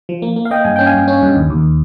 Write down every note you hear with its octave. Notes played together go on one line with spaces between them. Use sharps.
F3
A#3
A#3
F5
A#3 D#5 G5
G2 G#5
C#4 G5
F5 G#5
G2
C#4
G2
D#2
D#2